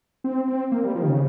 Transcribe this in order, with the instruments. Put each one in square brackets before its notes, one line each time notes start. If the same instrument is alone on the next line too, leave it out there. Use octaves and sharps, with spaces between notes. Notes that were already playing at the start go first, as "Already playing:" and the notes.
[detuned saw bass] C4
C4
A#3
G3
F3
D#3
C#3